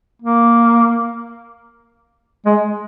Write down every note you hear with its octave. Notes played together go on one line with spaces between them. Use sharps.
A#3
G#3